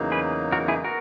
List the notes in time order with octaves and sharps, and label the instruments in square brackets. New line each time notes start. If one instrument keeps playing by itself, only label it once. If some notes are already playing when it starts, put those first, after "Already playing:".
Already playing: [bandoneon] E2 C#3 F#3 A#3 D#4
[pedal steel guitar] G#4 B4
F#4 A#4
E4 G#4
[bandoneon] B3 [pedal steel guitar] F#4 A#4